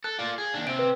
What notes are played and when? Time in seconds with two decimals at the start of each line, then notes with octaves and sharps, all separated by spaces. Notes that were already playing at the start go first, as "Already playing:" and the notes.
0.04 A4 F#6
0.19 F4 D5
0.38 G#4
0.54 D#2 D4
0.67 C3 C4 D7
0.79 B4